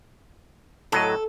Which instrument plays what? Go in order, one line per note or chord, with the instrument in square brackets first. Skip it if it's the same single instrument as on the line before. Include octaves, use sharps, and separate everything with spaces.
[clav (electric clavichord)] A2 F#3 D#5 [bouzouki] A4